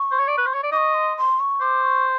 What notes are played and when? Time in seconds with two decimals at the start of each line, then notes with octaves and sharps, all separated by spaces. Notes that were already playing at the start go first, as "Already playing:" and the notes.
Already playing: C#6
0.11 C5
0.19 C#5
0.28 D5
0.38 B4
0.46 C5
0.54 C#5
0.64 D5
0.72 D#5 D6
0.76 C#6
0.94 C6
1.17 C6
1.39 C#6
1.61 C5 D6
1.83 C#6